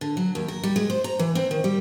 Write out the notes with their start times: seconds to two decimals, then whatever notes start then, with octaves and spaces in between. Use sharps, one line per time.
0.01 D3
0.17 F#3
0.35 D#2
0.48 A#4
0.63 G3
0.76 G#3
0.90 C5
1.04 A#5
1.19 E3
1.35 C4
1.51 D#3
1.64 G3